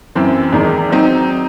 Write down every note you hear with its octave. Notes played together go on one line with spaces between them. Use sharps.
F#2 E3 C4
E2 D#3 G#3 D#4
F#3 C4 D#4